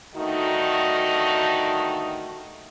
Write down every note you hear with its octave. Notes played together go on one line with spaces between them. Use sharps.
G2 D3 D#3 A3 D#4 F#4